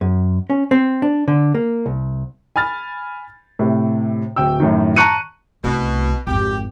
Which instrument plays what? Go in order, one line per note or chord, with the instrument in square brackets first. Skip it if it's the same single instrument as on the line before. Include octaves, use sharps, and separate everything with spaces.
[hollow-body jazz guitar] F#2
C#4
C4
D4
D3
A#3
C2
[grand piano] G#5 B5 F6 A6
A2 C3
D1 G5 E6
F#2 A2 D#3
A5 A#5 C#6 F#6 C#7 D#7
[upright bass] C2 A3 [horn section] B2
[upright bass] G#1 F2 [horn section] G4